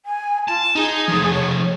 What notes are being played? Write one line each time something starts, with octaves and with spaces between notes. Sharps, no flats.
G#5
F4 A5
D#4 G#4
F3 A3
C#5